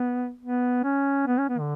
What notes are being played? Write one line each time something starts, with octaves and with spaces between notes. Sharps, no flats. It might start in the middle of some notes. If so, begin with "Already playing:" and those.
Already playing: B3
B3
C#4
B3
C#4
B3
D3